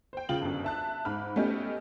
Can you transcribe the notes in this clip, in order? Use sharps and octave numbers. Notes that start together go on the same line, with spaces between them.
C5 G5
C#3 F4 G5 F#7
G1 F#2
E5 A5 F#6
G#2 B5 F6
A3 B3 C#4 D#4 G4